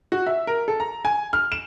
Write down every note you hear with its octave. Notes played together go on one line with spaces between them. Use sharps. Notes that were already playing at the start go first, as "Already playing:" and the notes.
F#4
E5
A#4
A4
A#5
G#5
F6
E7